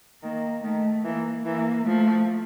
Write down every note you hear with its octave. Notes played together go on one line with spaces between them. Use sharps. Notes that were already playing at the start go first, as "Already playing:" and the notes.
D#3 A#3
D#3 A3
E3 A#3
E3 A#3
F3 A3